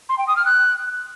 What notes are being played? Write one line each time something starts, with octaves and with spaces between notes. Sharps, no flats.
C6
G5
D#6
F6
F#6